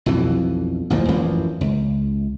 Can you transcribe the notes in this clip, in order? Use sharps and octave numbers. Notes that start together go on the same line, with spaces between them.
B1 F2 B2 E3
A1 D2 A#2 F3
A1 F#2 E3 F3
C#2